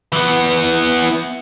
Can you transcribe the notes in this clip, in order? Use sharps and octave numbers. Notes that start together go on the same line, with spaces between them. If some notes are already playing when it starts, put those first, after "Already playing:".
E3 B3